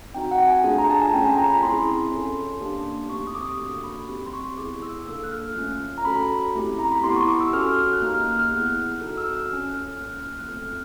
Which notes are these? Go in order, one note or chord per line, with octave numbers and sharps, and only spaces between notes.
C4 D#4 F#4 G5
F#5
G#5
A3 D4 F4 G#4
A#5
A5
G#5
A3 C#4 F4 G#4 G5
G#5
A#5
B5
C4 E4 G#4 C6
C#4 F4 A4
A#3 D4 G4
A3 C4 D#4 G4 C#6
D#6
D6
A#3 D4 F#4 A4 C#6
B5
C4 D#4 G4
C6
C#6
B3 E4 G#4 D6
E6
A#3 D4 F4 A4 E6
F#6
F6
A3 C#4 F4
A#5
C#4 F#4 A4 B5
A3 C4 E4 G4
A#5
B5
B3 E4 G4 C6
C#6
D6
E6
C#4 F#4 A4 F6
F#6
A#3 D#4 G4 F6
F6
F#6
F6
B3 E4 G#4
F#6
C4 D#4 F#4 A4 F6
E6
F6
C#4 F4 A4 F6
F#6
F6
A#3 C#4 F4 F6
F6
F#6
F#6
A3 C4 F4 A4 F6